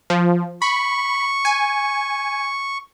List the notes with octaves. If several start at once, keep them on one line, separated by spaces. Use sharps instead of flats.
F3
B5 C#6
G#5